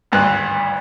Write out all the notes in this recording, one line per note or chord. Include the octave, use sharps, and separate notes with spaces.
G#1 D2 G2 B4 F#6